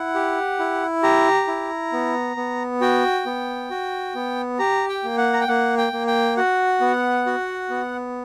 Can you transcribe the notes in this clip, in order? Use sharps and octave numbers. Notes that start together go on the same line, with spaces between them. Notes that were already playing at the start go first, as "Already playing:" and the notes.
Already playing: E4 F#5
G4
E4
G4 A#5
E4
B3
B3
F#4 G5
B3
F#4
B3
G4 A#5
G5
A#3
F#5
A#5
G5
A#3 F#5
G5
A#3
G5
F#4 F#5
B3
F#4
B3